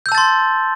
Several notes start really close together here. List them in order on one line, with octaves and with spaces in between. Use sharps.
G6 E6 A5 A6 C6